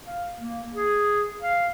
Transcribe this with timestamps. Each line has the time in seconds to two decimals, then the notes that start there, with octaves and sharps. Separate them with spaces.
0.06 F5
0.39 A#3
0.74 G#4
1.41 F5